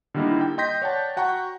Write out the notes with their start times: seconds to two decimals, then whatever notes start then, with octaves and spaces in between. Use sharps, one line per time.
0.14 D3 D#3 G3 A#3 D#4 E4
0.41 G5
0.58 D#5 G5 C6 G6 A#6 B6
0.82 C#5 D5 F#5 G5 A5
1.17 F#4 F#5 G5 A#5 C#6